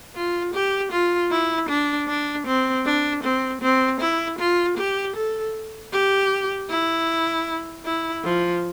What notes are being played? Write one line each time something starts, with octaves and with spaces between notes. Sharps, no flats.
F4
G4
F4
E4
D4
D4
C4
D4
C4
C4
E4
F4
G4
A4
G4
E4
E4
F3